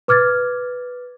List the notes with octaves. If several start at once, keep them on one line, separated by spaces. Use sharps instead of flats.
B4 D6 F6 G#6 A6